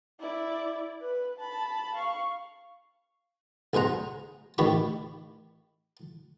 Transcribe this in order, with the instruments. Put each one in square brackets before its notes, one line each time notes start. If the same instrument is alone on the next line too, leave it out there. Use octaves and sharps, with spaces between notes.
[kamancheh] E4 D5
B4
A5 B5
F5 C#6
[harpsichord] B1 G#4 C5 F#5 A#5
A1 D#3 G4 B5 C#6